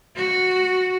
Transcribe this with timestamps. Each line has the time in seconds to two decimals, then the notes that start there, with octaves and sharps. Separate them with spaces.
0.17 F#4